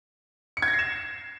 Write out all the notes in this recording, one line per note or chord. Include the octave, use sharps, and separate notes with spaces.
C#7
G#6
A#6
C7
E7